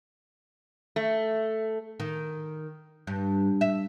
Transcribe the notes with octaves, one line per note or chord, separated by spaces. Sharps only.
A3
D#3
G2
E5